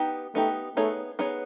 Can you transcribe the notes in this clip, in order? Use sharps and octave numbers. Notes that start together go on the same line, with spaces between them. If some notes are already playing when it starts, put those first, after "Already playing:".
Already playing: B3 D#4 G4
A3 B3 D#4 G4
A3 B3 D#4 G#4 C#5
B3 D#4 G#4 C#5